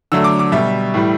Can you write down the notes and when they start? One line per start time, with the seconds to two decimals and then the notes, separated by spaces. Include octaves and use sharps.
0.12 D3 F#3 A3 E6
0.24 D6
0.39 D6
0.52 B2 G3 E5
0.94 A2 E3 G3